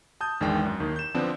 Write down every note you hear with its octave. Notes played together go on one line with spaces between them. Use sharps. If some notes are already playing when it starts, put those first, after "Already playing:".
A5 D#6 G6
G#1 E2 D#3 G#3 D4 G5
F#2
D#2 D#3
G6 E7
D3 F3 B3 C4 D4